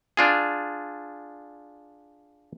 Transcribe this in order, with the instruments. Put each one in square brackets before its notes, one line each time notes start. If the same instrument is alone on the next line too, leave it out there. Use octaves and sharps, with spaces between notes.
[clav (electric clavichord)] D4 F4 G#4